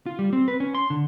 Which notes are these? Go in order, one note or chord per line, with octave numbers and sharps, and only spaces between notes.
F4
G3
C4
B4
C#4
C6
D3